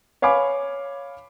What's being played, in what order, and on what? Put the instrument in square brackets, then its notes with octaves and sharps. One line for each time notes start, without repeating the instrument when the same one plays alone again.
[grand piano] C#5 F5 G#5 B5 D6